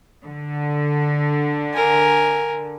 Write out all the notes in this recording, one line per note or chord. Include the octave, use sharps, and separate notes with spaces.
D3
A#4 G#5